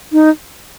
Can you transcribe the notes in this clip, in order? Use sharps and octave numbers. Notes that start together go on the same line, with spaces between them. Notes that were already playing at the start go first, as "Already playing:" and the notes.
D#4